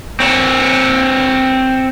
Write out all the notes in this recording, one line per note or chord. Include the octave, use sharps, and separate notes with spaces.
C4 C#5